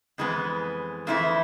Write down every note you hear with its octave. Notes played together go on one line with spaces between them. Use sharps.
F2 E3 G#3 B3
F2 E3 A3 E4 F4